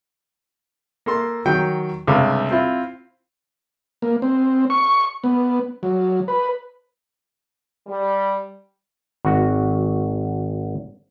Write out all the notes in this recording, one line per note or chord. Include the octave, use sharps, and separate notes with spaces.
A#3 A4 C6
D#3 F#3 G5
C#2 G2 C3 A4 F5
C4 E4 F4
A#3
C4
C#6
B3
F#3
B4
G3
G#1 F#4